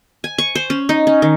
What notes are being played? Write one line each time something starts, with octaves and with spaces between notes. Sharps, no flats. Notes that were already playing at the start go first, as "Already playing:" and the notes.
G#5
C#6
C5
C#4
D#4
C#4
D#3